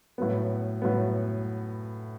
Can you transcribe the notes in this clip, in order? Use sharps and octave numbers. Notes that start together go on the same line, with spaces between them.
A2 F#3 B3
A2 F#3 B3